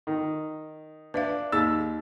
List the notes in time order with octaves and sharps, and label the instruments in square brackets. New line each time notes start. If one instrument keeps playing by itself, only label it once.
[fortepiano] D#3
[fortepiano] D4 [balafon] B4 E5 F5
[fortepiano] D#2 [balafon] D#4 G#4 [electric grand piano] E6 A6